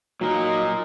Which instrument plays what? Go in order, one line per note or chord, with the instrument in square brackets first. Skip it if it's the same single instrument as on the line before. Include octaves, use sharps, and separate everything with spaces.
[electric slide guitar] A#2 A#3 [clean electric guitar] F#3 [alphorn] D#4